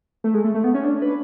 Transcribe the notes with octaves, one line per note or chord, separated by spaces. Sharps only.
A3
G#3
A3
A3
B3
C#4
D4
B4